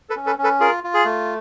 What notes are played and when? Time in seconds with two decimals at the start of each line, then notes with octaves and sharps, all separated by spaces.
0.10 A4 B4
0.16 C#4
0.26 A4 B4
0.38 C#4
0.44 A4 B4
0.60 F4 G#4 A#4
0.84 F4
0.94 G#4
1.05 A3